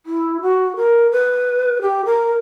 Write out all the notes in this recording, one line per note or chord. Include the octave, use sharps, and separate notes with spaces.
E4
F#4
A#4
B4
G4
A#4